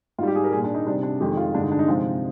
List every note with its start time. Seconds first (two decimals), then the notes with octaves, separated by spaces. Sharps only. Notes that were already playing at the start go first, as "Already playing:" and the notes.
0.18 G#2 F4
0.23 G3 G4
0.36 G#4
0.44 A#4
0.52 G3 G#4
0.56 A#2
0.64 D4
0.74 D#4
0.86 C3 G3 D4
1.03 D4
1.20 F2 D#3 G#3 G4
1.37 F4
1.55 G2 D3 G#3 D4
1.63 D#4
1.72 D4
1.79 D#4
1.88 C3 F3 G#3 F4